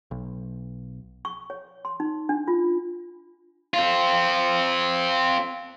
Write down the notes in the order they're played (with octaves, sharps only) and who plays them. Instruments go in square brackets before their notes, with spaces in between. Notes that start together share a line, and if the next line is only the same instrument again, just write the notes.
[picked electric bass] B1
[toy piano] C#6
C#5
C6
D#4
D4
F4
[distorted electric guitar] C4 F4